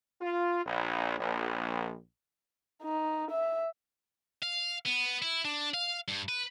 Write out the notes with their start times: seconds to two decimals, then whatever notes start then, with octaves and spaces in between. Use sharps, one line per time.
0.21 F4
0.65 A#1
1.19 A#1
2.83 D#4
3.31 E5
4.42 F5
4.85 B3
5.22 E4
5.45 D4
5.74 F5
6.08 G2
6.29 B4